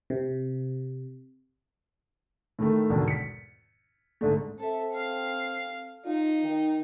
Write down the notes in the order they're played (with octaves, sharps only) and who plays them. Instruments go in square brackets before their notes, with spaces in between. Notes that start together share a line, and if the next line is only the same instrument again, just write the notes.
[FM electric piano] C3
[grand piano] A2 D#3 A3
E2 G#2 B2 D3 D#3
B6 C#7
G#2 D3 A3
[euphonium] C4 [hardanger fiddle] A4 E5
[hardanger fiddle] F5
[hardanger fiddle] D#4 [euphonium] F4
[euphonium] D#3